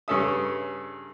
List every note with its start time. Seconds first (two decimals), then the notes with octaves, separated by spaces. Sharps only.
0.08 G2 C#3 C#4 A4 E5 D#6